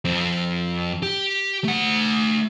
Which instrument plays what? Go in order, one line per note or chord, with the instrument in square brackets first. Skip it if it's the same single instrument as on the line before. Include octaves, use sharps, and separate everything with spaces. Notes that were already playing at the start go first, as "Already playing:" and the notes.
[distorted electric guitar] F2 C4
G4
A3 F#5